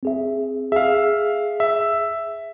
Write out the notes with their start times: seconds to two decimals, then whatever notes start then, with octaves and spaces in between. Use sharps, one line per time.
0.03 C4 G#4 E5
0.72 G#4 E5 F5
1.60 E5